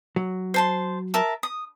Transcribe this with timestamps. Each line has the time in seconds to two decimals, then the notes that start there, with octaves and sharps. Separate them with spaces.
0.16 F#3
0.54 C5 A5 C6
1.14 A#4 E5 A5
1.43 D#6